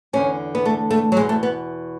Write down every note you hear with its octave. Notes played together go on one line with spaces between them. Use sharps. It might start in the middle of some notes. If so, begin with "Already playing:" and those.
E2 D3 C#4
B3
A3
A3
F#3
E2 B2 G#3
A3
B3